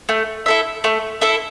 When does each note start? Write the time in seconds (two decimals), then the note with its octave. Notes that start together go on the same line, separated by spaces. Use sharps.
0.09 A3
0.46 E4 A4 E5
0.84 A3
1.21 E4 A4 E5